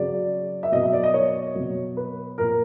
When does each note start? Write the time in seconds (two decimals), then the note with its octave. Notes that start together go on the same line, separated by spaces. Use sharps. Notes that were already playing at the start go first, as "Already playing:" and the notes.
Already playing: C#3 F#3 D5
0.63 E5
0.72 B2 F#3 D#5
0.83 E5
0.93 D5
1.03 D#5
1.14 C#5
1.55 B2 F#3
1.97 B4
2.38 A#2 F3 A#4